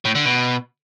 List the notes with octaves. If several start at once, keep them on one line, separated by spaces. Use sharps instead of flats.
A2
D3
B2